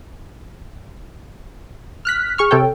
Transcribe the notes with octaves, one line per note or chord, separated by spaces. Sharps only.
F6 F#6 B6
G#4 C#6 F6
C3 A4 C#5 G5